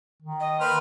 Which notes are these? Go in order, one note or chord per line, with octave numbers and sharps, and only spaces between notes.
D#3
D#5
A#3 B4 C5 F6